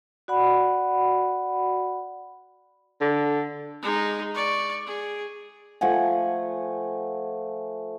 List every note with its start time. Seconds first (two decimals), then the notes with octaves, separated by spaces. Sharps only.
0.28 F#4 D5 F#5 B5
3.01 D3
3.82 G#3 D#4
4.34 D5 C#6
4.87 G#4
5.81 F3 A3 F#5 G#5